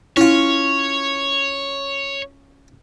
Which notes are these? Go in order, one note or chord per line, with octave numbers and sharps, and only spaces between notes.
C#4 E4 F4 C#5